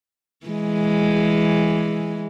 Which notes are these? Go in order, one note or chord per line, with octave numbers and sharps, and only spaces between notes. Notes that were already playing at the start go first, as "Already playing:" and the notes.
E3 G#3